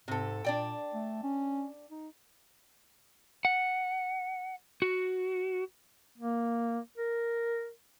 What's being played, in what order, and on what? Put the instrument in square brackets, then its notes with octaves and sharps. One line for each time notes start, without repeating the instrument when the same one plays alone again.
[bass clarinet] G#2 [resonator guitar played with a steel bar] C3 A4
[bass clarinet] A#2 [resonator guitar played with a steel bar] D4 D5 G5
[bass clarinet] A3
C#4
D#4
[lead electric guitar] F#5
F#4
[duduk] A#3
A#4